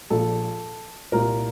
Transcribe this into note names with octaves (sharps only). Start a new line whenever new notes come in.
A#1 A#2 A4
C2 A#2 A#4